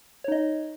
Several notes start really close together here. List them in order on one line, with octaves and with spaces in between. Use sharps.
C#5 D#4 D#5